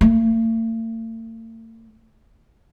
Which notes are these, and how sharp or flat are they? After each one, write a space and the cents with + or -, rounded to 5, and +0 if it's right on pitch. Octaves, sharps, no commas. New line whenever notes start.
A3 +45